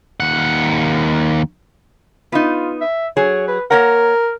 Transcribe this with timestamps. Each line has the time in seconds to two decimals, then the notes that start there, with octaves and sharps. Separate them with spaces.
0.20 D#2 F#5
2.32 B3 D#4 F4
2.81 E5
3.17 F#3 G#4 C#5
3.48 B4
3.71 A#3 A#4 C#5 F#5